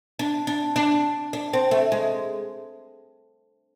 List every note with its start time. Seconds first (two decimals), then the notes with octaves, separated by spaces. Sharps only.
0.19 D4
0.47 D4
0.76 D4
1.33 D4
1.53 C4
1.71 A3
1.92 G#3